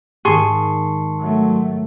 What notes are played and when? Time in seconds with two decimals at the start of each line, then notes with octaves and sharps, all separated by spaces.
0.25 G#2 D#3 G#4 A5 C6 C#6
1.20 F#3 A3